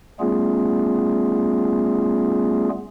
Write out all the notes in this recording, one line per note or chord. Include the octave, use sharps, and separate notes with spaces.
G3 A3 B3 C#4 F4 G#4